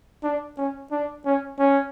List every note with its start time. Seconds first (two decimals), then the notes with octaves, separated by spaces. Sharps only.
0.23 D4
0.58 C#4
0.91 D4
1.25 C#4
1.59 C#4